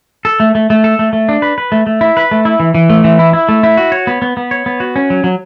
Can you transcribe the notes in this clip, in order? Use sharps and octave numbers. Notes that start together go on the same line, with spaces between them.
A4
A3
A3
A3
A4
A3
A3
D4
B4
B4
A3
A3
E4
B4
A3
E4
E3
E3
A3
E3
E4
E4
A3
E4
F#4
C#5
B3
B3
B3
C#5
B3
F#4
C#4
F#3
F#3